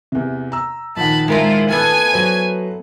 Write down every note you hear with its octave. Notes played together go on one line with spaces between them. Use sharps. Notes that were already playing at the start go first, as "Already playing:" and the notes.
E2 C3
A#5 E6
A#1 D#3 F#5 A5 B5
G#3 E4 F4 A#4 C5
E3 A3 B3 G#5
F#3 B4 C5